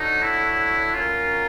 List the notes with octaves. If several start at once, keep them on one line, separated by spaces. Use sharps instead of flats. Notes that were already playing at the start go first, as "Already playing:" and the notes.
Already playing: D4 D#4 F#4 A4 C#5 F#5
E4
C#4 F4 F#4 A#4